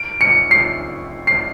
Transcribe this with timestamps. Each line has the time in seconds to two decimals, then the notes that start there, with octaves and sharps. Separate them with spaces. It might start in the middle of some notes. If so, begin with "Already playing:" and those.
Already playing: D7
0.21 C#7
0.51 C7
1.27 C7